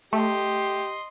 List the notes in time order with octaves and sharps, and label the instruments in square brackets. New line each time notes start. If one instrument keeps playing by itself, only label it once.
[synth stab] A3 [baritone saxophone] G4 [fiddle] D#5 C6